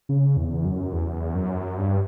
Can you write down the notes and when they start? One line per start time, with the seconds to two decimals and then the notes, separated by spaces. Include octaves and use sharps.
0.09 C#3
0.37 E2
0.65 F#2
0.93 E2
1.35 F#2
1.78 G2